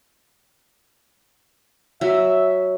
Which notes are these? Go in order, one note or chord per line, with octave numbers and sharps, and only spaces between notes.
F#3 E5